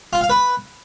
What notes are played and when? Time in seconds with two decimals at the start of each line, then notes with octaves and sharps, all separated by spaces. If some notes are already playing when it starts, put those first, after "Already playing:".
0.13 F4
0.21 F5
0.30 B4